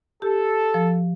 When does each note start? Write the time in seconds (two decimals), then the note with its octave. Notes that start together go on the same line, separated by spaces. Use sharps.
0.22 G4 A4
0.74 F3